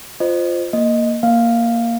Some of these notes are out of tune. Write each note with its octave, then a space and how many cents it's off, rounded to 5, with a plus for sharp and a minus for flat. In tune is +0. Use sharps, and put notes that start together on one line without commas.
F4 +0 C5 -5 D#5 -30
A#3 +0 D#5 +0
A#3 +0 F5 +0